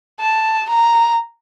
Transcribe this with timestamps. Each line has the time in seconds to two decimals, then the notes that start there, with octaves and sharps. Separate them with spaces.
0.20 A5
0.69 A#5